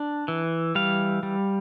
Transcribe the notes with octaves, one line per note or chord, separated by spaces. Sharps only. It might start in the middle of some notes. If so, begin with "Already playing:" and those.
Already playing: D4
E3
G3 F5
G3